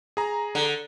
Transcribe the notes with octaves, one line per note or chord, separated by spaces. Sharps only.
G#4 A#5
D3